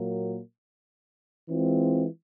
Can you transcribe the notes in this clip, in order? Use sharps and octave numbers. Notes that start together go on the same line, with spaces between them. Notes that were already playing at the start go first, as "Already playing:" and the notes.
Already playing: A#2 F#3 A#3
E3 G#3 C4 F4